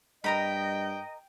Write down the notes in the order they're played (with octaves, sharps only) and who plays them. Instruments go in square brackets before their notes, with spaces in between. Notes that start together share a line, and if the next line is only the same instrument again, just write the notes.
[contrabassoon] G2 [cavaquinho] A#4 A#5 B5 [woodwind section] D#5 [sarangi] G5